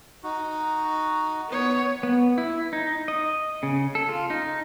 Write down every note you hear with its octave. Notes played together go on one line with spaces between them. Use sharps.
D#4 F#4
B3 C#5
B3
E4
D#4
D#5
C#3
A4
F4
D#4